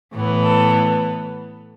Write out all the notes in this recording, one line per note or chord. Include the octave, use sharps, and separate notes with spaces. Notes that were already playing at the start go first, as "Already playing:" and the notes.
A2 E3 B3
A4